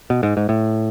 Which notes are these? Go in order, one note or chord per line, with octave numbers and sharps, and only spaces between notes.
B2
G#2
G#2
A2